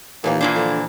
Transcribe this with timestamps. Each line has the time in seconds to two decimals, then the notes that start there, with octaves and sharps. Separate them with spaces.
0.24 D#2 A#2 E3 A#3
0.41 A#2 E3 D4 C5
0.55 D3 F3